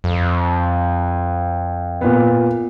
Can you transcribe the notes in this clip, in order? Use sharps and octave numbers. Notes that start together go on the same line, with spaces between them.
F2
A#2 B3